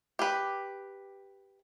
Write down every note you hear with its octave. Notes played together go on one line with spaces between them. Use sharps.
G4 B4